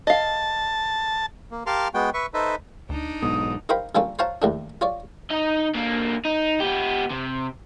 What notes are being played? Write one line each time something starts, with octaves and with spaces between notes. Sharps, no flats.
D#5 F5 A5
A#3
G4 A#4 F5 A5 C6 F6
G#3 B3 F#4 G5
B4 E5 C#6
D#4 A4 B4 C5 D#5 E5
D2 D4 D#4
B1 G#2 B3 D#6
D#4 A#4 C5 F5 G5 B5
D3 G3 A#3 C#4 F4 A4
C5 C#5 F5 F#5 A5 A#5
D#2 A2 D4
F4 C#5 D5
D#4 D#5
D3 A#3
D#4
B3 G4
C3